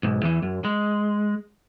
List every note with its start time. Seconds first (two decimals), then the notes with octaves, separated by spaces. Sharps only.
0.03 B1 G#2
0.23 E2 E3
0.43 F#2
0.65 G#3